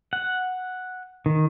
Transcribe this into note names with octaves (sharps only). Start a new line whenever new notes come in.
F#5
D#3